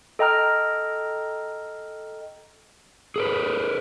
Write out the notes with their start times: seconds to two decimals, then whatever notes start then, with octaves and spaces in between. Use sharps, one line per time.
0.19 A4 D#5 G5 A#5 F6
3.16 G#4 A#4 B4